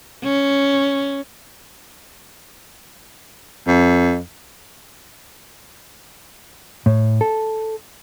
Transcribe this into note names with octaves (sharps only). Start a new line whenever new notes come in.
C#4
F2
A2
A4